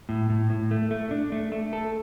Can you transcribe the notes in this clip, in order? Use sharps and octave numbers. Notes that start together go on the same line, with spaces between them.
A2
A2
A2
A3
A3
D4
A3
A3
A4